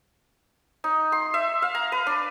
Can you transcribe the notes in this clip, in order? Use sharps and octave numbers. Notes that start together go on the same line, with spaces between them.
D#4
C6
E5
F5
A#5
B4
D4